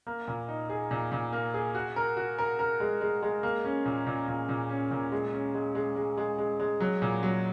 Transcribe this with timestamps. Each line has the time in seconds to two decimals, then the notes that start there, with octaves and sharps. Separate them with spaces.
0.07 A#3
0.28 A#2
0.48 D#4
0.70 G#4
0.91 A#2
1.12 A#2
1.33 A#3
1.54 G#4
1.75 F#4
1.96 A#4
2.17 F#4
2.38 A#4
2.59 A#4
2.80 G#3
3.01 G#3
3.22 G#3
3.43 A#3
3.64 C#4
3.85 A#2
4.07 A#2
4.28 A#2
4.49 A#2
4.69 C#4
4.91 A#2
5.12 G#3
5.34 C#4
5.54 G#3
5.75 G#3
5.96 G#3
6.17 G#3
6.38 G#3
6.60 G#3
6.80 F#3
7.02 A#2
7.23 F#3